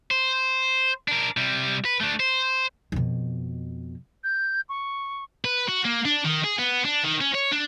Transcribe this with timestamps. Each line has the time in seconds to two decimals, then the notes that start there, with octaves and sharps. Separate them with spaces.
0.11 C5
1.08 D4 A#4
1.37 C3 G3
1.85 B4
2.01 A3 D4
2.20 C5
2.92 F2 B2
4.24 G6
4.69 C#6
5.45 B4
5.69 F#4
5.85 A#3
6.05 D4
6.24 D#3
6.44 G#4
6.58 B3
6.85 D4
7.04 D#3
7.21 C#4
7.34 C#5
7.51 D4